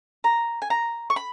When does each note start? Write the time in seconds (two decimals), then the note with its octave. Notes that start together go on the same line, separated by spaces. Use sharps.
0.24 A#5
0.62 G#5
0.70 A#5
1.10 C#6
1.16 B5